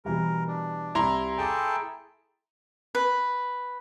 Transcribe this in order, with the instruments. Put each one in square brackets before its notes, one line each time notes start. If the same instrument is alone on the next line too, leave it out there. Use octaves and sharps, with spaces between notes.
[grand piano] B2 E3 G3 [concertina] A#4
[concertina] D4
[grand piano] C2 C3 F7 [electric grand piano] E4 A#5 C6
[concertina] G#4 A4 G5 [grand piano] A5 D6
[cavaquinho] B4